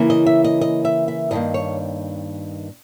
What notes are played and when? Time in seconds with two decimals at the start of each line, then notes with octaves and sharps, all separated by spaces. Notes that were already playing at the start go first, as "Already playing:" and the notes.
Already playing: C#3 E3 A#3 C#4
0.10 D#5
0.26 E5
0.44 D#5
0.61 D#5
0.85 E5
1.08 E5
1.31 G2 D#3 A#3 D#5
1.54 C#5